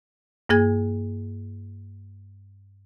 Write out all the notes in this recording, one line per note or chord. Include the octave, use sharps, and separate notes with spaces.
G2 A#3 G#4 G#6